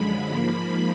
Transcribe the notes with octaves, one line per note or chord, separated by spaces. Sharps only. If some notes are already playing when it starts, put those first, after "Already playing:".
Already playing: F#2 D3 F3 G#3 B5
G#2 F3 A#3